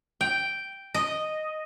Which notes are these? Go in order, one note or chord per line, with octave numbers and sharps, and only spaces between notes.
G5
D#5